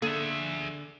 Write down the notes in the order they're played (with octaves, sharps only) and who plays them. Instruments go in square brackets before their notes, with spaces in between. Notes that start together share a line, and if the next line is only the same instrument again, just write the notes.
[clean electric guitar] D3 [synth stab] A#3 A4 [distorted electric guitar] G#4 E5